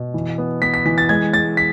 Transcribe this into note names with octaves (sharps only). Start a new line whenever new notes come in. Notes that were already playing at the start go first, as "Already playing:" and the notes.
Already playing: B2
E3
B3
B3 B6
B6
E3 B6
A6
G#3 G#6
G#3 A6
B6